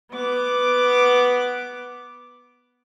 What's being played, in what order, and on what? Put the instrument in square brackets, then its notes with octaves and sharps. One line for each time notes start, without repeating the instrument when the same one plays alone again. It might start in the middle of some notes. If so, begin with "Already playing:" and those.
[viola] B3 D6